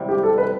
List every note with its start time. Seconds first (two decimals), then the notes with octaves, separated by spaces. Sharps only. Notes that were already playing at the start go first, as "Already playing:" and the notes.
Already playing: C3 G3 C4 E4
0.09 G4
0.23 A4
0.38 B4